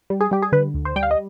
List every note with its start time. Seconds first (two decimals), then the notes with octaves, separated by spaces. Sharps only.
0.10 G3
0.21 G#4
0.31 G3 G4
0.42 G#4
0.52 D3 B4
0.74 D2
0.85 C5
0.96 G3 G5
1.03 F5
1.11 D#5